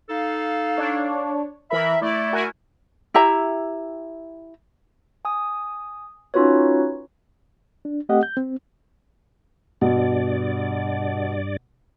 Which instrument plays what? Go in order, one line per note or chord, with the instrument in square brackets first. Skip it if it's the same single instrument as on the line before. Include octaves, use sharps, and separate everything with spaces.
[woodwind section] D#4 A4 F5
[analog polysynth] D4 C#5
[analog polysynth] E3 A#4 B5 [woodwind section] E5
[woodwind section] A3 E4 [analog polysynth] D5
[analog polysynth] F#4 A#4 G#5
[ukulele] E4 G4 E5 A#5
[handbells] G#5 D#6
C#4 D#4 F4 F#4 B4 C#5
[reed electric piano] D4
A3 C4 G4 D#5 F#5
G6
C4
[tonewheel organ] G2 D5 [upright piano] B2